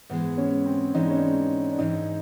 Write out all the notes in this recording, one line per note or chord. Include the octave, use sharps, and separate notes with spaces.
G#2 E3 G#3 B3
C#4
C4
G#2 E3 G#3 D#4
D4
C#4
D4
D4
G#2 E3 G#3 D#4